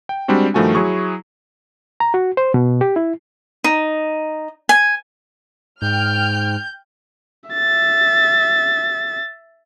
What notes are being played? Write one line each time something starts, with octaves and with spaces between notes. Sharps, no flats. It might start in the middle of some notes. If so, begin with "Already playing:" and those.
G5
G3 G#3 C4 D4 F#4
G2 D#3 F3 A3 F#4 G#5
F#3 E4 G#4 C#6
A#5
F#4
C5
B2
G4
E4
D#4
G#5
G#2 G5 F6 G6
E5 A6